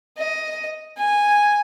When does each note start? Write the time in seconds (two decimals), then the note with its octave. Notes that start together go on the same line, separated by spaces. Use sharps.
0.18 D#5
0.98 G#5